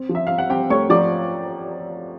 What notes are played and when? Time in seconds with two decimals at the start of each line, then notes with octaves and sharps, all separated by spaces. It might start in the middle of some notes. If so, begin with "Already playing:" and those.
Already playing: C4
0.09 F3
0.15 E5
0.27 C4 F5
0.38 F#5
0.50 C4 G4 G5
0.70 A3 C#5 C#6
0.90 F3 D5 D6